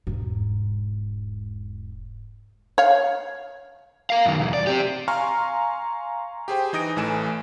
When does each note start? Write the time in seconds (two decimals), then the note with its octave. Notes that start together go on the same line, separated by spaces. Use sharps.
0.07 E1 G#2
2.78 C#5 F5
4.10 A#4 F5
4.26 F#2 D#3
4.39 B1 E2
4.54 D5
4.67 C4 G4
5.08 F5 G#5 A#5 C6 C#6 F6
6.48 G4 G#4 C5 G5
6.73 E3 D#4 D#6 A#6 D7
6.96 A1 E3 A3 G#5 E7